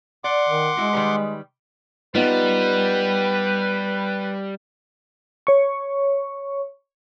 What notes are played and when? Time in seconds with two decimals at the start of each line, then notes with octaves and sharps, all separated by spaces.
0.24 D5 F#5 C6 D6
0.49 D#3
0.77 G#3 E4 F#4
0.93 D#3 G3 B4
2.15 G3 B3 D#4 F4 B4
5.47 C#5 C#6